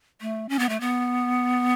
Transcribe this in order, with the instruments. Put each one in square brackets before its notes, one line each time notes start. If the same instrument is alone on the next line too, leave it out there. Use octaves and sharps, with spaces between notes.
[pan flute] A3
C#4
B3
A3
B3